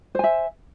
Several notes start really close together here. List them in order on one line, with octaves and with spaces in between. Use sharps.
C5 G#5 E5